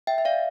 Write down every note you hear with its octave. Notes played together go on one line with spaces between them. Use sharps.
E5 G5
E5
D5 F5